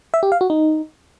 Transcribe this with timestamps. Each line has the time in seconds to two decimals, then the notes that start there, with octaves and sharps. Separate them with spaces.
0.14 E5
0.23 G4
0.32 F5
0.41 F#4
0.50 D#4